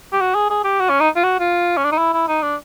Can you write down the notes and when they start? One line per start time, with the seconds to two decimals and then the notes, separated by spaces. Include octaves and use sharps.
0.12 G4
0.21 F#4
0.35 G#4
0.50 G#4
0.64 G4
0.80 F#4
0.89 C#4
1.00 D#4
1.16 F4
1.24 F#4
1.40 F4
1.77 C#4
1.85 D4
1.92 D#4
1.98 E4
2.13 E4
2.28 D#4
2.43 D4